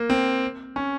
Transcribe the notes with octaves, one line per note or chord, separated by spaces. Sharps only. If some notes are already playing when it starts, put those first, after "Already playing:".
Already playing: A#3
C4
C#4